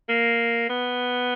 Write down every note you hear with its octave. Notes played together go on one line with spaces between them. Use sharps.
A#3
B3